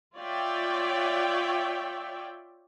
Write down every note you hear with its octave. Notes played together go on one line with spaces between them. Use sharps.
F4 C#5 D5 E5 G5